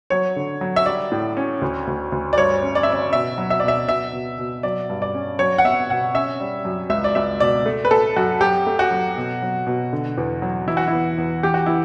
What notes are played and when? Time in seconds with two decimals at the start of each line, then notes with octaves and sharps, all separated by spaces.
0.10 F#3 C#5
0.36 D3
0.61 F#3
0.76 E5
0.86 G3 D5
1.12 A2
1.37 C#4
1.61 D2
1.87 D2
2.12 D2
2.33 D5
2.37 G2 C#5
2.63 C#4
2.75 D5
2.83 E5
2.88 C#4 D5
3.13 B2 E5
3.38 F#3
3.50 E5
3.60 D5
3.64 B2 E5
3.88 B2 E5
4.13 B2
4.39 B2
4.63 F#3 D5
4.90 G2
5.02 D5
5.14 C#4
5.39 F#3 C#5
5.58 F#5
5.64 B3 E5
5.90 B2 F#5
6.14 C#4 E5
6.40 G3
6.65 F#2
6.90 C#2 E5
7.04 D5
7.15 C#2 E5
7.40 B2 D5
7.66 A3
7.85 B4
7.91 A3 A4
8.17 F#2 F#4
8.41 F#3 G4
8.66 A3
8.79 F#4
8.91 F#3
9.17 B2
9.42 F#3
9.67 B2
9.93 D3
10.18 E2
10.42 F#3
10.67 E3 E4
10.77 F#4
10.88 E2 E4
11.18 E2
11.43 E3 G4
11.54 F#4
11.66 E3 E4